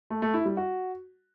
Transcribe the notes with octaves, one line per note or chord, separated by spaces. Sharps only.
A3
A3
E4
G3
F#4